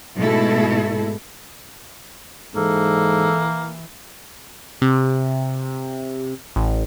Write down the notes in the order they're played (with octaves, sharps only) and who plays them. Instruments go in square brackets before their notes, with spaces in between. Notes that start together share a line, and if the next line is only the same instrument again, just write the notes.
[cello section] G#2 B2 G#3 A3 E4 A4
[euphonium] G#2 [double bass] E3 [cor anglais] A#3 [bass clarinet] A4
[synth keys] C3
A1